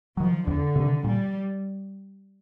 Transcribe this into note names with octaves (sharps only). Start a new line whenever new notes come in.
D#3 F3 F#3
E2 D3
C3 D#3
A#2 G3